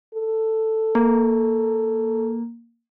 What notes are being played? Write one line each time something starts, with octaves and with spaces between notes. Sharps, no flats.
A4
A#3